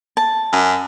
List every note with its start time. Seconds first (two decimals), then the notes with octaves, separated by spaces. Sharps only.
0.17 A5
0.53 F#2